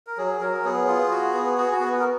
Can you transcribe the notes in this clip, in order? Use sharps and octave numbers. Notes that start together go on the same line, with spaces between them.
A#4
F#3 G#4
F#3 A#4
B3 G#4
F4
F#4
B3
F#4 G#4
F#4
B3
A#4